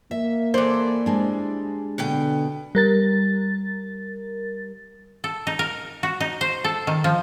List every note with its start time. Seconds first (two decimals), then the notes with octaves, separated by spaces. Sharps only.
0.11 A#3 E5
0.54 E3 A4 C5 D5
1.06 G3 G#3 D4
1.98 B2 D3 B3 G5
2.75 G3 A#4 A6
5.24 A4
5.47 D#4
5.59 A#4
6.03 F#4
6.20 D#4
6.41 C5
6.64 A4
6.87 D#3
7.04 F3